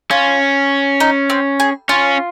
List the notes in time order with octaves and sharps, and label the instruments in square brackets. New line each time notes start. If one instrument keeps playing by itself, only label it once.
[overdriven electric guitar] C#4 [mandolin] F4
[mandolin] D#4
C4
G#4
[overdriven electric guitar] C#4 [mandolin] F4